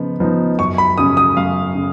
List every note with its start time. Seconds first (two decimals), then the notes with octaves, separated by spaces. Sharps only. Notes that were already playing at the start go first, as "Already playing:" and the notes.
Already playing: C#3 F3 B3 D#4
0.20 F3 B3 D#4
0.59 F#2 C#6
0.78 B5
0.98 C#3 F#3 C#4 D#6
1.17 D#6
1.37 F#2 F5
1.75 C#3